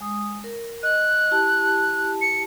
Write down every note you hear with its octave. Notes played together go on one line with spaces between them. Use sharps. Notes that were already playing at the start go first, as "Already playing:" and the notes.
G#3 D#6
A#4
D#5 F#6
E4 G4 A5
C#7